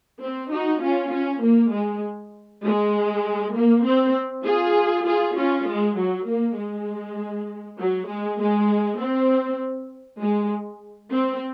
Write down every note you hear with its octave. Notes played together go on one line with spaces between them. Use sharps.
C4
D#4 F#4
C#4 F4
C#4
A#3
G#3
G#3
A#3
C4
F4 G#4
F4 G#4
C#4 F4
G#3
F#3
A#3
G#3
F#3
G#3
G#3
C4
G#3
C4